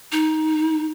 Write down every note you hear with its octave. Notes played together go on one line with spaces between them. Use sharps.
D#4